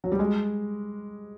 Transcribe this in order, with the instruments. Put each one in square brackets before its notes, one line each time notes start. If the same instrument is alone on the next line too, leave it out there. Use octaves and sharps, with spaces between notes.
[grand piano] F#3
G3
G#3